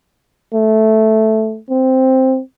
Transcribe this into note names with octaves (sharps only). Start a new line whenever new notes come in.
A3
C4